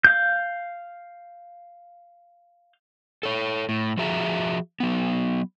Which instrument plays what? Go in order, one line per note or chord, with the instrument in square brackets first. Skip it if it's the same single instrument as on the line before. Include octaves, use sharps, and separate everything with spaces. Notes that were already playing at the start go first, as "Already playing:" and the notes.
[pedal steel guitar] F5 G6
[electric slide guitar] A4 C#5
A2
F3 F#4 G#4 E5 A#5
F#3 B3